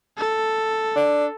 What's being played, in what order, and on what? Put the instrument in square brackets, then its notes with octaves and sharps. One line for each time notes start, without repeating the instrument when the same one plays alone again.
[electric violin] A4
[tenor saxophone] D4